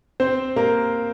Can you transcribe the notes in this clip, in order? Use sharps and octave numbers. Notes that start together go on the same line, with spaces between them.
C4 C5
A#3 A#4